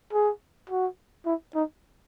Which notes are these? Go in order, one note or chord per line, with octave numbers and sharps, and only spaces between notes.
G#4
F#4
E4
D#4